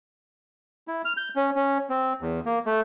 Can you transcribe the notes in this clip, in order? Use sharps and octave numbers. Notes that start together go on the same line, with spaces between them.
E4
F6
G6
C#4
C#4
C4
E2
A#3
A3